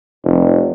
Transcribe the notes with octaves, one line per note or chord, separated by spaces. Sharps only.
F1